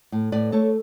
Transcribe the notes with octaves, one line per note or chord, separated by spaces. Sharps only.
A2
A2 B4 D5
A3 A4 C#5